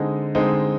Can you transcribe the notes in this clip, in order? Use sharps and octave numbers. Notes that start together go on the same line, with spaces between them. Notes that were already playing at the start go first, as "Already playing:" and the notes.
Already playing: D3 G#3 C4 D#4
D3 G#3 C4 D#4